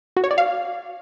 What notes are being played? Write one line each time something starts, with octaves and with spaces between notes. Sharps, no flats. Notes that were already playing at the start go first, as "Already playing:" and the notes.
F#4
C#5
D5
F5